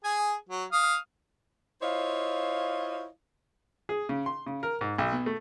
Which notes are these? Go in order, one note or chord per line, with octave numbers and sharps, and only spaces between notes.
G#4 G#5
F#3
F5 D#6
E4 F4 C5 C#5 D#5 F5
G#4
C#3
C6
C#3
A#4
G#2
B1
B2
A3